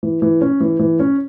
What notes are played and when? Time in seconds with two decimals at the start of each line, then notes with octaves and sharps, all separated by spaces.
0.03 E3
0.22 E3
0.41 C#4
0.60 E3
0.79 E3
0.99 C#4